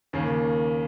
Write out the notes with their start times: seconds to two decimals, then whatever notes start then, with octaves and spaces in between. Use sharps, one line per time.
0.13 D#2 C#3 A#3